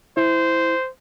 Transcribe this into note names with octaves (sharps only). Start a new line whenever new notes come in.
E4 C5